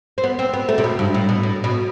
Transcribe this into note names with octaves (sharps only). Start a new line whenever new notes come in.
C4
B3
C4
B3
A3
C3
B2
G2
A2
B2
A2
B2